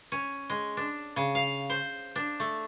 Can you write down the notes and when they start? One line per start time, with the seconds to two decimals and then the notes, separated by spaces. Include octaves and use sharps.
0.12 C#4
0.50 G#3
0.77 D4
1.16 C#3
1.35 F5
1.70 C5
2.16 D4
2.40 A3